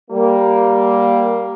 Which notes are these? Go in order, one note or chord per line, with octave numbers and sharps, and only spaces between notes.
G3 A#3